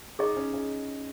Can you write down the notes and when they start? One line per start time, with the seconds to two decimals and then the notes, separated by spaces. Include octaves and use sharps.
0.19 D#4 G#4 D#5 C#6
0.37 C#4
0.54 C#4